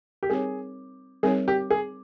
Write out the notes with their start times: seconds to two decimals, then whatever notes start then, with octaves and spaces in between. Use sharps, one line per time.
0.23 G4
0.30 G3 C4 D#4 G#4 A#4 C#5
1.23 G3 C4 D#4 G#4 A#4 C#5
1.48 G4
1.71 G#4